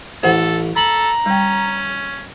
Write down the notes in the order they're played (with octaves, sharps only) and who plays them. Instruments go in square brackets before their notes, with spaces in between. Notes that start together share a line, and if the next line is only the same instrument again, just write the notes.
[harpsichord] A1 [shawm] A4 [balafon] C5 F#5
[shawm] A4 [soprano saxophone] A#5 [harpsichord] B5
[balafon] G3 G5 [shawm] C#4